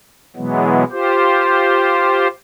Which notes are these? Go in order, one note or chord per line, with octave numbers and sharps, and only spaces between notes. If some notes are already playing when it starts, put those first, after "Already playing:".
B2 E3 F#3 G#3 B3
F4 G4 C5